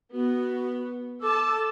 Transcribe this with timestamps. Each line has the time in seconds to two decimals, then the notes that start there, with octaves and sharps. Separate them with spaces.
0.13 B3 F#4
1.20 A4 A5 D6 E6